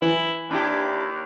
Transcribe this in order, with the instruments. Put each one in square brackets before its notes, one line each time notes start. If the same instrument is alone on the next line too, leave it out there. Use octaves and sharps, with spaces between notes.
[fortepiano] E3 [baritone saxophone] E4
[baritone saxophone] D#2 [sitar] D4 E4 G4